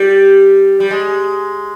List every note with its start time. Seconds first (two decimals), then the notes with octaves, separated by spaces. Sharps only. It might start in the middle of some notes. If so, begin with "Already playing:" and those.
Already playing: G3
0.80 G3
0.91 G#3